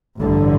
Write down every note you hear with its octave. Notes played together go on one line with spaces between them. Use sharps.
A1 G2 D3